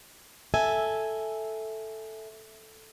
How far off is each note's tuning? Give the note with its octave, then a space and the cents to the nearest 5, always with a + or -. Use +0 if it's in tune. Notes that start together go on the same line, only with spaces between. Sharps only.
A4 +0 E5 -5 G#5 +0